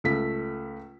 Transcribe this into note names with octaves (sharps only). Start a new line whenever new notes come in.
C#2 A3 B6